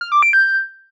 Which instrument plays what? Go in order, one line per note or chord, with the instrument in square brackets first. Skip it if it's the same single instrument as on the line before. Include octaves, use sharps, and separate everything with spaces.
[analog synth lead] F6
D6
D7
G6